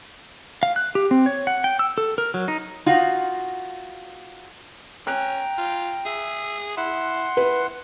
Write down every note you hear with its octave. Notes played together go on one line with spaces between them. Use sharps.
F5
F#6
G4
C4
C#5
F#5
G5
E6
A4
A#4
F#3
D#4
D#4 F4 F#4
C#4 G5 A#5 F#6
F4
G#4 E5
E4 F#5 C6
E4 B4